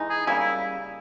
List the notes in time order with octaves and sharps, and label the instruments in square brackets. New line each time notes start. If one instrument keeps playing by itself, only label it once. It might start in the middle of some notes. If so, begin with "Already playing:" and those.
Already playing: [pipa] E3 G#3 D#4
[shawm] G#4
[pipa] C#3 G3 A#3 [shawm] E4
[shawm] E4